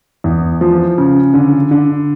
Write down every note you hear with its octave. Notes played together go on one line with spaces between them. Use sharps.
E2
F3
C#3
D3
D3